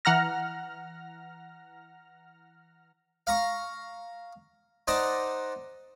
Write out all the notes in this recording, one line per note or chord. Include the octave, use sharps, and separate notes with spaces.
E3 F#5 A#5 F6 A#6
F5 A#5 C#6
D#4 C5 D5 F#5 A5 A#5